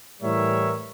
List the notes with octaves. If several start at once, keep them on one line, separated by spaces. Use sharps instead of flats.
A2 E3 G3 A#4 C#5 E5